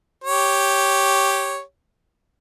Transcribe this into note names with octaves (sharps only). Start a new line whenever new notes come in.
G4 C#5